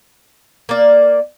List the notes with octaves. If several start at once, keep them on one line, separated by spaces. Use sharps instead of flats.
A#3 D5